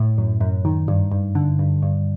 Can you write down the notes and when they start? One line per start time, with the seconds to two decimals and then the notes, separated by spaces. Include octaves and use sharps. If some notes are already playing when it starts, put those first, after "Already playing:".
Already playing: A2
0.18 F#2
0.41 F#2
0.65 D#3
0.88 G2
1.12 G2
1.35 D3
1.59 G2
1.82 G2